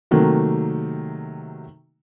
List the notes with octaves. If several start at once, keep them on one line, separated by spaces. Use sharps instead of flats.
C3 D#3 F#3 A3 A#3